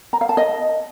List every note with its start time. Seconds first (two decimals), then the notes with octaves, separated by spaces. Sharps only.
0.13 A#5
0.21 F5
0.29 A5
0.37 D#5